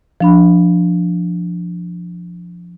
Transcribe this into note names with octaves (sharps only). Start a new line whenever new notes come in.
F3 D4 B5